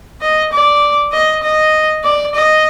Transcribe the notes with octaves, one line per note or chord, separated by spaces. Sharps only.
D#5
D5
D#5
D#5
D5
D#5